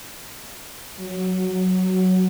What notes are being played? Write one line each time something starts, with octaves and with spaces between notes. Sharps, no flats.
F#3